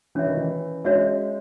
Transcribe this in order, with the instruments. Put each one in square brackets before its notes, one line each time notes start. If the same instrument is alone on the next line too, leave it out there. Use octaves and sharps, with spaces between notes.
[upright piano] E3 [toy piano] C#4 F#4 C#5 E5
[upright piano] D#3
E3
[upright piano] G#3 [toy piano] C#4 F#4 C#5 E5